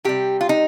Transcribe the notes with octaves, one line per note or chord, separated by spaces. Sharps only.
C3 G3 G4
F4
D#4